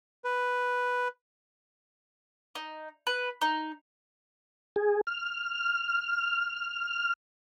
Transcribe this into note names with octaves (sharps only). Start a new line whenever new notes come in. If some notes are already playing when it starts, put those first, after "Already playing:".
B4
D#4
B4
D#4
G#4
F6